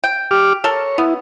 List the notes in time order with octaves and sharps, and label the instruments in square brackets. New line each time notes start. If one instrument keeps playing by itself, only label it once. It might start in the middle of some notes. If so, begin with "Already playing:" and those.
[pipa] G5
[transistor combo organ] G4 D6 F6
[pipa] A4 A#4 [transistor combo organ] C#5
[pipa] B3 [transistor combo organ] E4